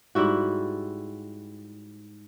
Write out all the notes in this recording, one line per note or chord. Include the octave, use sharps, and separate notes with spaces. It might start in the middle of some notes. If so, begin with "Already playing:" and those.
G#2 G3 E4 F#4